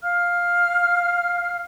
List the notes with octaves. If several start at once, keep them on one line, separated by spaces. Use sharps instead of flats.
F5 F6